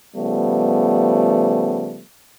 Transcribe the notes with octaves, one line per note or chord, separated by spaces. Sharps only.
C#3 F3 G3 A3 B3